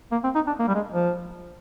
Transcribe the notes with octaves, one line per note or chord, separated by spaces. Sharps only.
A#3
C4
D#4
D4
A#3
G3
G#3
F3